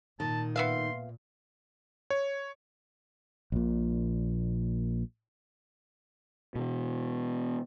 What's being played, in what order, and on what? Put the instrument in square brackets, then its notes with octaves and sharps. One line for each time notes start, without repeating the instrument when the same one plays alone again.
[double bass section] A#2 [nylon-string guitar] D#3 [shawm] A5
[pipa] B3 E5 F5 [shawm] C6
[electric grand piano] C#5
[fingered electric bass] A#1 A#2
B2 E3